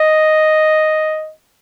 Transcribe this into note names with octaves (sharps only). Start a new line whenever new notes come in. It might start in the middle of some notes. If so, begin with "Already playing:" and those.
Already playing: D#5